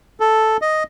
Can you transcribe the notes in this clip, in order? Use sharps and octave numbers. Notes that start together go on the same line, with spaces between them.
A4
D#5